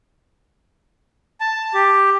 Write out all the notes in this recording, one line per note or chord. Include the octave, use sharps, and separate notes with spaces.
A5
G4